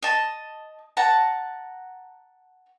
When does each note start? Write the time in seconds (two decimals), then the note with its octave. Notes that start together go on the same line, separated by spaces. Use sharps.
0.03 D#5 A5
0.97 F#5 A5 A#5